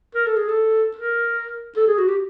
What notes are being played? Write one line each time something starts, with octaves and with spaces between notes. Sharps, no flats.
A#4
A4
G#4
A4
A#4
A4
G#4
F#4
G4